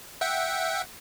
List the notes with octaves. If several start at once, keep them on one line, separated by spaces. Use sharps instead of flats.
E5 F#5 G5